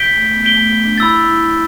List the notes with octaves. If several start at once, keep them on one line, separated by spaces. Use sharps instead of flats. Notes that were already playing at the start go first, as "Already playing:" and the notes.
Already playing: G6 B6 D7 G7
A3
B3
A3 G6 B6 D7 G7
A3
B3
D4
E4 B5 E6 A6
E4